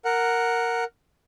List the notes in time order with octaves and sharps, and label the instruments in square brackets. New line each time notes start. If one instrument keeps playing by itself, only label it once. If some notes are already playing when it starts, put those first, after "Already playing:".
[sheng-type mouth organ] A#4 F#5